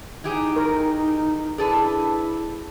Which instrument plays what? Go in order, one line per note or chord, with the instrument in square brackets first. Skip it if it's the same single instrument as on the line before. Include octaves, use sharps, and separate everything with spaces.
[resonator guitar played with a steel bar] E3 G4 G#4 [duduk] D#4
[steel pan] A#4
[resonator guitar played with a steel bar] D4 A4 B4 [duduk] E4 [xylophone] G#4